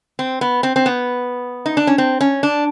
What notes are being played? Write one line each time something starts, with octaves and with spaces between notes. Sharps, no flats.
C4
B3
C4
C4
B3
D#4
D4
C#4
C4
C#4
D4